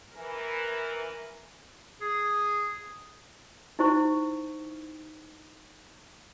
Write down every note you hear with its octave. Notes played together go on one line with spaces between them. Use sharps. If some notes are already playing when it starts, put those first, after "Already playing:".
E3 A#4
G#4
D#4 E4 C5 C#6